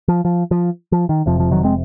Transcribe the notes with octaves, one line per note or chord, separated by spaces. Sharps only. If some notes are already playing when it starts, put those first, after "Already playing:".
F3
F3
F3
F3
D#3
F1 F2 C3 F3
F3
D#3 F#3
G#3 C4